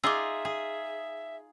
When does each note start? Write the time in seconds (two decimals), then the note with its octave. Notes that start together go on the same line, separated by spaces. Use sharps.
0.04 D#4 F4 G#4 E5 D6 E6
0.45 G#4